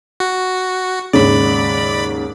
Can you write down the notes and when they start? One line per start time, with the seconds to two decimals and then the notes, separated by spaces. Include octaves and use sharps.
0.20 F#4
1.13 D#2 G#2 C#3 D5 B5